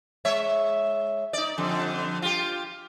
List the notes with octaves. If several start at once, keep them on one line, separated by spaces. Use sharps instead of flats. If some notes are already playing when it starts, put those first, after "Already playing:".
G#3 C#5 E5
D#4 D5
F2 D3 G3
F4 G4